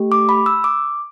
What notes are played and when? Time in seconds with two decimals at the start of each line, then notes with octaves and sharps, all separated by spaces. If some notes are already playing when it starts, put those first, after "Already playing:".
Already playing: A3 G4
0.12 D6
0.29 B5
0.46 E6
0.64 D6